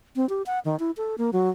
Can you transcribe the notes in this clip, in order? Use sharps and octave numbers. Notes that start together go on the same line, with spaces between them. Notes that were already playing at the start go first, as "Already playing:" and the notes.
C4
G4
F#5
D#3
E4
A4
A#3
F#3